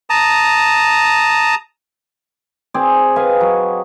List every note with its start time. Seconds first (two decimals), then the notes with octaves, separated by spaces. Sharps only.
0.10 A5 A#5 D#6
2.74 C4 G#4 D5
3.16 B4 D#5 F5 G#5
3.41 F#3